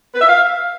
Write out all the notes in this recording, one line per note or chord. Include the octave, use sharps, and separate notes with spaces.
B4
E5
F5